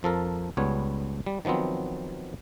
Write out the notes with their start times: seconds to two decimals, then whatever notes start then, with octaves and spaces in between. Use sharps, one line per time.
0.03 F2 F3 A4 A#4
0.57 C#2 G3 B3 C#5
1.26 G3
1.45 D#3 F3 F#3 B3 C4